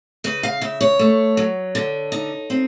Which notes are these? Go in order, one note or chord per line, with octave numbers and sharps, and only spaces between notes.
C#3 B4
F5
C#3 E5
C#5
A3
F#3
D3
D#4
C4